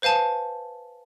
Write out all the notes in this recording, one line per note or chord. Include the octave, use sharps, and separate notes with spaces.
B4 C5 F5 G#5 A5